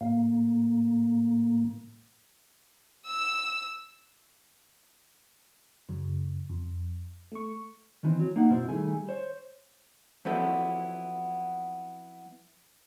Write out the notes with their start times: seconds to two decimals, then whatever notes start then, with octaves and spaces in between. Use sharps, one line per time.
0.01 A2 A#3
3.06 E6 E7
5.89 F#2 C#3
6.49 F2
7.32 A3 C#6
8.03 D#3 E3 C4
8.19 F#3
8.36 A#3 D#4 F#5
8.50 F#2 B2 C4 E4 C5
8.69 D#3 G3 A3 G#4 G#5
9.09 C5 C#5
10.25 F3 F#3 B3 C4 E4 A4